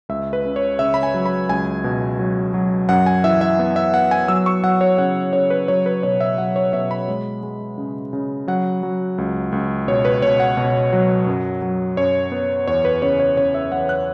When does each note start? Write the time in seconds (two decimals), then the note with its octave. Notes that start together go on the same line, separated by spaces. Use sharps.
0.09 C#2 E5
0.33 B4
0.45 C#3
0.56 C#5
0.79 C#3 E5
0.94 B5
1.03 G#5
1.14 F#3
1.26 B5
1.49 C#2 G#5
1.84 B2
2.19 F#3
2.54 F#3
2.89 F#2 F#5
3.06 G#5
3.24 E3 E5
3.41 E5
3.59 B3
3.76 E5
3.94 B3 F#5
4.11 G#5
4.28 F#3 E6
4.46 C#6
4.64 F#3 F#5
4.81 C#5
4.98 C#3 F#5
5.33 C#3 C#5
5.50 B4
5.68 F#3 C#5
5.86 B4
6.03 B2 C#5
6.20 E5
6.38 F#3 F#5
6.56 C#5
6.73 B2 E5
6.91 B5
7.08 G#3
7.43 G#3
7.78 C#3
8.13 C#3
8.48 F#3 F#5
8.83 F#3
9.18 C#2
9.52 C#2
9.88 B2 C#5
10.05 B4
10.22 B2 C#5
10.40 F#5
10.57 B2
10.93 F#3
11.27 F#2
11.62 F#3
11.97 F#2 C#5
12.32 B3
12.68 E2 C#5
12.85 B4
13.02 C#3 C#5
13.20 C#5
13.37 C#3 C#5
13.55 E5
13.72 E2 F#5
13.89 F#6